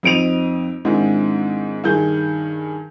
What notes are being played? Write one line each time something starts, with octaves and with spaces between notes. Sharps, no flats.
F2 C4 D#4 D7 D#7 F7
G#2 D#3 G#3 C4 D4 E4
G2 D#3 G#4 G6